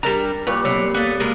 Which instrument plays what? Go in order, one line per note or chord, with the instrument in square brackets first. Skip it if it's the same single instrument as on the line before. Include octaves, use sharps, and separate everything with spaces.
[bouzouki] G3 D4 [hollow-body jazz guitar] A#4 A#5
[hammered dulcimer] A#2 G3 [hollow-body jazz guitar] B4 [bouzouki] C#5
[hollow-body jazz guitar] B1 [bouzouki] C4 B4 C#5
[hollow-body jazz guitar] A#3 [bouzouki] B3 A4
[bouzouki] B2 G#3 A#4